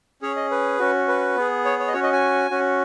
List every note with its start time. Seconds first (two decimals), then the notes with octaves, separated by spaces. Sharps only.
0.22 C#4 G#4 C#5
0.37 D#5
0.51 B4
0.79 C#4 F#4
1.08 B4
1.36 B3 G#4
1.65 C#5
1.79 C#5
1.88 D#5
1.93 C#4 F#4 C#5
2.03 D#5
2.13 G#5
2.51 C#4 F#4